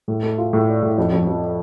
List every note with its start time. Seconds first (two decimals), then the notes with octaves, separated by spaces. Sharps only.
0.08 A2
0.23 A3
0.38 F4
0.53 A2
0.67 D5
0.83 A2
0.98 F2
1.12 F2
1.27 F3